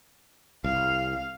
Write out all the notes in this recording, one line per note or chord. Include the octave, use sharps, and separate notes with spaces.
C2 F5